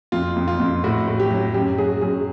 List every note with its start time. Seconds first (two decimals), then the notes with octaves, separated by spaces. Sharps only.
0.12 F2 F4
0.36 F2
0.48 F4
0.60 F2
0.84 A2 F#4
1.08 A2
1.20 G4
1.31 F#3
1.54 F#2 G4
1.78 F#3 G#4
2.01 F#2 G#4